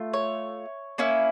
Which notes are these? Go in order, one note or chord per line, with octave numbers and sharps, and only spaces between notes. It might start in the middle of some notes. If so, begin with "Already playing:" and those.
Already playing: A3 F4
C#5
A#3 C#4 E4